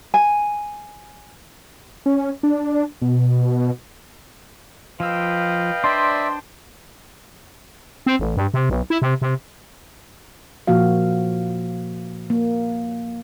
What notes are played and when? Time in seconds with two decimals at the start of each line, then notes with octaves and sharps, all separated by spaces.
0.14 G#5
2.06 C#4
2.43 D4
3.02 B2
5.00 F3 B4 D#5 F5 G5 E6
5.84 D4 C5 D5 E5 C6
8.06 C4
8.19 A1
8.37 G2
8.54 C3
8.70 B1
8.90 E4
9.02 C3
9.22 C3
10.67 A#2 F3 A#3 F#4 F5
12.30 A#3